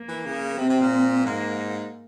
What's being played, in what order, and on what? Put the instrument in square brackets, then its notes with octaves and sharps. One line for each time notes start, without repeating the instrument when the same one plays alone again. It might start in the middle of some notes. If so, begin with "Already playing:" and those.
Already playing: [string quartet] A#3
[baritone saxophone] E3
C#3
[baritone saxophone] C3 [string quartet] C4
[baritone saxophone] C3
A#2
[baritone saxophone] G#2 [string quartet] A#3